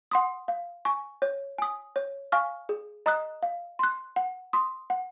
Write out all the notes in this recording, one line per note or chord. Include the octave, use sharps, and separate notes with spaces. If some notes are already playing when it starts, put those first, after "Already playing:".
F#5 C6 D#6
F5
G#5 C#6
C#5
G#5 D#6
C#5
F5 G#5 C#6 F6
G#4
D#5 A#5 D#6 F#6
F5
C6 F#6
F#5
C6 D#6
F#5